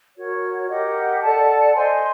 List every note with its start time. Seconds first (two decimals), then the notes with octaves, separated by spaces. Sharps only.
0.16 F#4 A#4 C#5
0.69 G4 A#4 D#5 F#5
1.22 A4 D5 F#5 A5
1.75 C5 D#5 G#5 C6